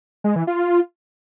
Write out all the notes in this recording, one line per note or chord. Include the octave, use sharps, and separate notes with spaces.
G#3
E3
F4